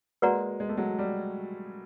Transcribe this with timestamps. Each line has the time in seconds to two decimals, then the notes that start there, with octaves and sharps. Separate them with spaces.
0.22 G#3 A#3 F#4 B4 D5 F#5 A#5
0.60 G#3
0.69 A3
0.77 F#3 G#3
0.99 G3